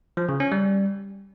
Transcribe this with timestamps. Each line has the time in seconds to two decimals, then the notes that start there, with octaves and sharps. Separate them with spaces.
0.17 F3
0.29 C#3
0.40 C#4
0.52 G3